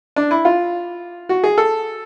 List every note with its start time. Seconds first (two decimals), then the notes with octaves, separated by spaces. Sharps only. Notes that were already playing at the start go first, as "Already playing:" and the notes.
0.16 D4
0.31 E4
0.45 F4
1.29 F#4
1.44 G#4
1.58 A4